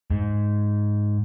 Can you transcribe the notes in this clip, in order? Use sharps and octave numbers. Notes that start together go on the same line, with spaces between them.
G#2